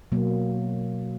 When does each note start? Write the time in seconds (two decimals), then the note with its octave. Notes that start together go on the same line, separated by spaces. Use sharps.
0.12 B2 F#3 A#3